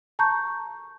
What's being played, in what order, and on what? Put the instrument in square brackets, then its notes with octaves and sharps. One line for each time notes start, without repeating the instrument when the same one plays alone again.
[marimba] A5 A#5 C#6 G6